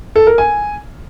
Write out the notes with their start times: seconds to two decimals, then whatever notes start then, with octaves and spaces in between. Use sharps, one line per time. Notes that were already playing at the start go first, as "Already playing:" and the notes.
0.16 A4
0.27 A#4
0.38 G#5